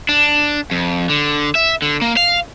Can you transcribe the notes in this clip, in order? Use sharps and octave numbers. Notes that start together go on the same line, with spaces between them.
D4
F2
D3
E5
D3
A#3
F5